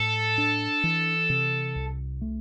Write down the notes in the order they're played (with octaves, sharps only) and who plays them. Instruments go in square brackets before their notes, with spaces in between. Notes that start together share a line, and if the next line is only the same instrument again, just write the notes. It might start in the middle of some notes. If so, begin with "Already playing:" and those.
Already playing: [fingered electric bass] A2 [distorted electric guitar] A4
[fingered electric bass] D4
E3
C3
C2
A3